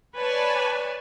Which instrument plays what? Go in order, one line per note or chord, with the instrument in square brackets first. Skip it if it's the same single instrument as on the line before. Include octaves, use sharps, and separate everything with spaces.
[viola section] B4 C#5 D5 G#5 A5